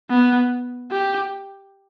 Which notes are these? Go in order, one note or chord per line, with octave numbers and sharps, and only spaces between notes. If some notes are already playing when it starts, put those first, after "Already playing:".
B3
G4